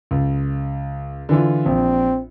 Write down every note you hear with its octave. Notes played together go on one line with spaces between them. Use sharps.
C#2
D3 E3 F4
A#1 C4